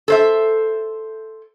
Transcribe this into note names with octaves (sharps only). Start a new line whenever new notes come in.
A4 C5 E5